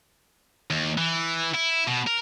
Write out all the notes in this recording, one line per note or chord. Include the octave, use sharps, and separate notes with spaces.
D#2
E3
E4
B2
A#4